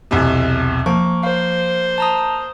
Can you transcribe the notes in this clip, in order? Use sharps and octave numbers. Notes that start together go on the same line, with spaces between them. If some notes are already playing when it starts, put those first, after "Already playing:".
B1 E2 C3
F3 A#3 C#6
C5 F5
A5 A#5 D#6